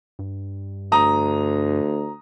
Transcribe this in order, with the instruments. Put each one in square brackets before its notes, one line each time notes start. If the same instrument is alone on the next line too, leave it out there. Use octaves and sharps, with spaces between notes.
[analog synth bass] G2
[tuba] D2 [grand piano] A#5 D#6